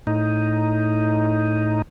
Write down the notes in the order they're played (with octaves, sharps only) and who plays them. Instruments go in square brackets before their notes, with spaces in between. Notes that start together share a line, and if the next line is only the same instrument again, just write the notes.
[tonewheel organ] A2 D#4